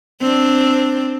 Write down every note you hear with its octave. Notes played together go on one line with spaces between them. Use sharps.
C4 D4